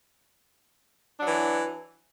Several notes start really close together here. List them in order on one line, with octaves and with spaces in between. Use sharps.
D4 F#3 E3